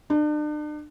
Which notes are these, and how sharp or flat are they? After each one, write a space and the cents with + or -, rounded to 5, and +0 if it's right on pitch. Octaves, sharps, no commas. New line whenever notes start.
D4 +40